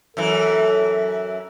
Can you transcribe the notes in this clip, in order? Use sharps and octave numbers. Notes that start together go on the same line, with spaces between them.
F#2 E3 A4